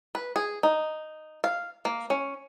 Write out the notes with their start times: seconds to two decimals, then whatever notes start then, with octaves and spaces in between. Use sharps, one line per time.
0.15 B4
0.36 G#4
0.63 D#4
1.44 F5
1.85 A#3
2.10 C#4